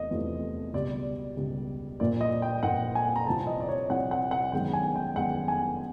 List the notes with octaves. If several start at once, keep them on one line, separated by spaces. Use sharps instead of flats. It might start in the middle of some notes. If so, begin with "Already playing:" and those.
Already playing: E2 C3 A3 D#5
E2 C3 F3 A3
C#2 B2 G3 D5
C#2 B2 G3
A#2 F3 A#3 D5
D#5
G5
A#2 F3 A#3 F#5
G#5
A#5
C2 C3 F3 A5
D#5
D5
C#5
C2 C3 F3 F#5
F#5
F#5
F#2 D#3 G#3 B3 G5
G#5
G5
F#2 D#3 G#3 B3 F#5
G#5